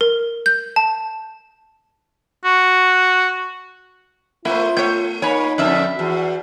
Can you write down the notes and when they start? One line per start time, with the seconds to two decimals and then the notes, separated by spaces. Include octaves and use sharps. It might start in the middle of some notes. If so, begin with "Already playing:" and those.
0.01 A#4
0.46 G6
0.76 A5
2.45 F#4
4.45 A3 A#3 E4 F4 C5
4.77 A3 C#5 G6
5.22 A#3 D#4 C#5 G#5 B5
5.58 F2 D3 B4 E5 A5
5.99 E2 F#4